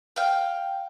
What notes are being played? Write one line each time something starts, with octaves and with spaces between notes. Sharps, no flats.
F5 G5